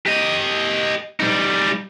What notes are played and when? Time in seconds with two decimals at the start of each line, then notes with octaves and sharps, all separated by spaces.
0.06 G4 D#5
1.20 G3 D#4